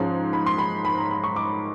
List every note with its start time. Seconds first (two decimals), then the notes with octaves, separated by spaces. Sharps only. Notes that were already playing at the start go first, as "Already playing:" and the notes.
Already playing: G#2 F3 G#3 C#4
0.33 B5
0.46 C6
0.58 B5
0.85 B5
0.98 A#5
1.11 B5
1.24 C#6
1.36 D6